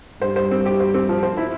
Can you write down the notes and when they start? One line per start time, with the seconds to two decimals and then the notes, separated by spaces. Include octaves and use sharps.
0.22 G2 C5
0.36 C5
0.51 C4
0.65 G4
0.80 C5
0.94 C4
1.09 F3
1.23 C5
1.37 E4